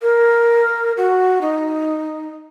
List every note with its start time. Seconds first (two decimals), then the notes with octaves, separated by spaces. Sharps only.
0.02 A#4
0.97 F#4
1.41 D#4